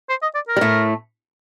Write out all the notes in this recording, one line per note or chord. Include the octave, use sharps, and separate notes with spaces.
C5
D#5
D5
A#4
G3
A2 A3